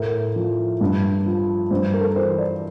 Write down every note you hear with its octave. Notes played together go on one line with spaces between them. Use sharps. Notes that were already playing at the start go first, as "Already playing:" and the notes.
Already playing: A2 A#4
F3
G2
F3
G2 C5
A#4
A4
A#4
E3 C5
D5